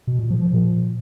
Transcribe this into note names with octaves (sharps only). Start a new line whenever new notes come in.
B2
A#2
F3
F3
A#2